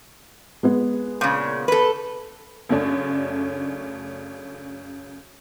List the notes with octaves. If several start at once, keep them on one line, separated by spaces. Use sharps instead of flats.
G#3 B3 G#4
A#2 C#3
A4 B4
F#2 C#3 A3 C#4 D4